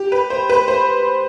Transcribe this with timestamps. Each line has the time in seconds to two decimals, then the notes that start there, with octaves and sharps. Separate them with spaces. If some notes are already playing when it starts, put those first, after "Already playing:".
Already playing: G4
0.12 B4
0.30 C5
0.50 B4
0.68 C5